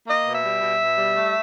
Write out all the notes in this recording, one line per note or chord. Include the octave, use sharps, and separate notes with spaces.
A#3 D#5
B2
E5
G3
B2
B2
G3
A3